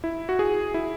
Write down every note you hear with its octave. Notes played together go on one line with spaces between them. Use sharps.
E4
F#4
G#4
E4